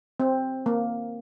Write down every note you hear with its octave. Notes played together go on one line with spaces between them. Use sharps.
C4
A#3